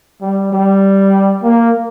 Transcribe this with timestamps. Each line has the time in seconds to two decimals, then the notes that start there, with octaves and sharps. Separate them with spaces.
0.22 G3
0.53 G3
1.43 A#3